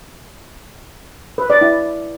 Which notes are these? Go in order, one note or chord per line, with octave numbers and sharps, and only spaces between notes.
B4
D5
E4